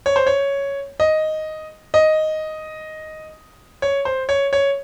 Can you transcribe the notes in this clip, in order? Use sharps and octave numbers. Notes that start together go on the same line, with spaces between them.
C#5
C5
C#5
D#5
D#5
C#5
C5
C#5
C#5